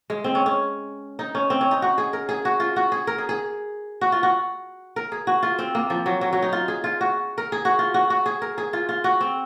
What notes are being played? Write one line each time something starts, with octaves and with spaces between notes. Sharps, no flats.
G#3
C4
C#4
C#4
D#4
C#4
C4
C#4
D#4
F#4
G#4
A#4
G#4
F#4
F4
F#4
G#4
A#4
G#4
G#4
F#4
F4
F#4
A#4
G#4
F#4
F4
C4
A#3
F3
F#3
F#3
F#3
D#4
F4
G#4
F4
F#4
A#4
G#4
F#4
F4
F#4
F#4
G#4
A#4
G#4
F4
F4
F#4
C4